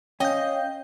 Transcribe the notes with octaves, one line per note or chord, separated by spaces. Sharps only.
C#4 D#5 F5 G5 G6